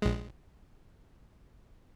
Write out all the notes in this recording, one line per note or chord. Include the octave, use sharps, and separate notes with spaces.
A#1 G#3